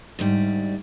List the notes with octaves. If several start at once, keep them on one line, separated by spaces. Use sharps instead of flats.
D2 G#2 G3